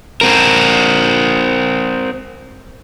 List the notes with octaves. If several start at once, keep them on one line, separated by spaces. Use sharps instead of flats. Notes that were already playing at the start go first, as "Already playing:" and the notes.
C4 A#4